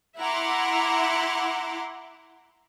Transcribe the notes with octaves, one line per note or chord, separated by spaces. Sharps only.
E4 E5 F#5 A#5 C6 D6